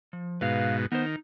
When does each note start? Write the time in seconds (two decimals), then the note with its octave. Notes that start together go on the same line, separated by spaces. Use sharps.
0.13 F3
0.41 G#2 B2 B4 F5
0.92 D#3 B3 C5
1.06 D#4